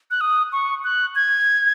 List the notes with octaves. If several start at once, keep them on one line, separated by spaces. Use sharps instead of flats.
F#6
D#6
C#6
F#6
G#6